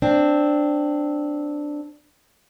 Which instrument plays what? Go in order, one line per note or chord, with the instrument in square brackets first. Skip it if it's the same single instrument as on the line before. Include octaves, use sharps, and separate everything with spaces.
[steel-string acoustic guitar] C4 D4